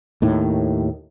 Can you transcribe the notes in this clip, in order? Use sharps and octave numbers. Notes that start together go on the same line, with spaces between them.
D#2 A2 D#3